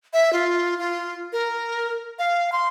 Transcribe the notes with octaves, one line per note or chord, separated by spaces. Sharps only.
E5
F4
F4
A#4
F5
C6